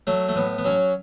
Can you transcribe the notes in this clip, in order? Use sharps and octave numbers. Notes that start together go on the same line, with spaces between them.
F#3 A3
A3
A2 B3
B3
F#3 C#4